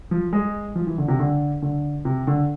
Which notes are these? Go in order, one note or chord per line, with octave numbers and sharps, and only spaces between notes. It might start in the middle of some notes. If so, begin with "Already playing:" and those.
F3
G#3
F3
E3
D3
C3
D3
D3
C3
D3